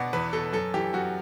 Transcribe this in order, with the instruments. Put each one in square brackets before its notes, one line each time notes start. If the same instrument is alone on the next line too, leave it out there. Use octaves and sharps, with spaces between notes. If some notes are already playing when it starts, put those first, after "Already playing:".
Already playing: [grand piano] B2 D5 F#5
E2 B4
B2 A4
F#2 A4
E3 G4
F#2 F#4